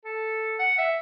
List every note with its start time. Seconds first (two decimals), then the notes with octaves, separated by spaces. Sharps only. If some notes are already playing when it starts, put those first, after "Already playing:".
0.05 A4
0.59 F#5
0.78 E5